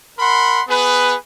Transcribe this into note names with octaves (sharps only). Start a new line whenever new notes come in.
A#4 F#5 B5 C6
B3 G#4 B4